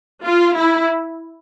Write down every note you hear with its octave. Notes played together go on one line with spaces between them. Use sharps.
F4
E4